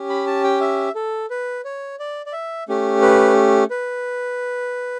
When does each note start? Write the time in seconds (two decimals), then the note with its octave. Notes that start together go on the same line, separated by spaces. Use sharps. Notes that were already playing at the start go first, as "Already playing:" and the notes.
Already playing: C#4 G4
0.10 B5
0.27 A5
0.44 G5
0.61 E5
0.95 A4
1.30 B4
1.65 C#5
1.99 D5
2.26 D5
2.33 E5
2.68 A3 C#4 G4
3.02 B4
3.70 B4